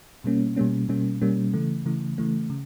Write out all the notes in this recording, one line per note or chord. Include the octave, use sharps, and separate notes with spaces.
B2 G3 A#3 C#4
B2 G3 A#3 C#4
B2 G3 A#3 C#4
B2 G3 A#3 C#4
C#3 E3 A3
C#3 E3 A3
C#3 E3 A3
C#3